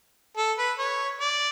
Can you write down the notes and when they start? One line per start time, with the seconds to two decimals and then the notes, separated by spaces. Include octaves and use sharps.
0.37 A4
0.58 B4
0.79 C#5
1.21 D5